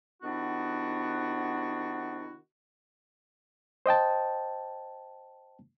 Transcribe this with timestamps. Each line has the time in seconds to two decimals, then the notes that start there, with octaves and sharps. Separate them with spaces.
0.22 C3 D#3 B3 D4 E4 F#4
3.86 C5 D#5 G5 A5